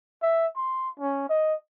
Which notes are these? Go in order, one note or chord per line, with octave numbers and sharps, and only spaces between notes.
E5
C6
C#4
D#5